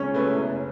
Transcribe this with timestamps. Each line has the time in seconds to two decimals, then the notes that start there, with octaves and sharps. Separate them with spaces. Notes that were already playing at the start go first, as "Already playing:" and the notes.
Already playing: C#2 C#4
0.14 B2 A3 E4 B4
0.37 F#1